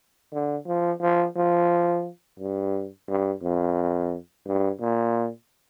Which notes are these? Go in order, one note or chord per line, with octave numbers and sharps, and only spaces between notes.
D3
F3
F3
F3
G2
G2
F2
G2
A#2